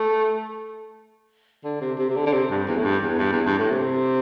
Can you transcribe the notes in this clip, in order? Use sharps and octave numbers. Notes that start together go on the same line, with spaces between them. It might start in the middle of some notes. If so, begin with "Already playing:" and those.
Already playing: A3
D3
C3
C3
C3
D3
D3
C3
G2
E2
A2
G2
E2
G2
E2
G2
A2
C3